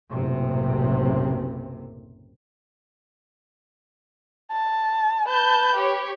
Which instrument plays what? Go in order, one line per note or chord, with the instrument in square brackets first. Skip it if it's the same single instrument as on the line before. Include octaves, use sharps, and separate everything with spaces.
[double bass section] F#1 B1 A2 C3
[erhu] A5
[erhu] B4 [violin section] A5 G6
[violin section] G4 C#5